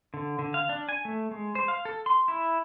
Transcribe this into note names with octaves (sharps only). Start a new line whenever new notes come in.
D3
D3
F5
D4
G#5
A3
G#3
C5
F5
A4
C6
E4